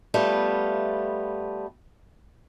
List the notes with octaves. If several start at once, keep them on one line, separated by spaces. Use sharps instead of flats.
G3 A3 B3 F4